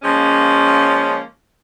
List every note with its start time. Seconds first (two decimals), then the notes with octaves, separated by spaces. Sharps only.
0.03 F3 G#3 A#3 C#4